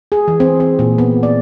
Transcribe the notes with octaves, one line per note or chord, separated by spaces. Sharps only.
G#4
E3
C4
C4
A#2
B3
D5